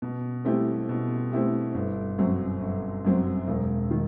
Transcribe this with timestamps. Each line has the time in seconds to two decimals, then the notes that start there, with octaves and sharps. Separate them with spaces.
0.02 B2
0.45 A3 C4 E4 G4
0.89 B2
1.31 A3 C4 E4 G4
1.74 G1
2.18 F#2 F#3 C4
2.61 G1
3.05 F#2 F#3 C4
3.48 E1
3.91 D#3